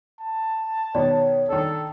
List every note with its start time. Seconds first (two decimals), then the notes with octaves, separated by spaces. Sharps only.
0.19 A5
0.95 B2 D#3 B3 C#5 D5
1.49 D#3 D4 A4